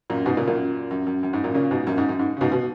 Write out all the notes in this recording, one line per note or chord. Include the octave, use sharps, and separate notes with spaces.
F#2 A#2
G#2 B2
A#2 C#3
F#2 A#2
F#2
F#2
F#2
G#2
F#2 A#2
A#2 C#3
G#2 B2
F#2 A#2
G#2
F#2
G#2
C#3
G#2 B2
B2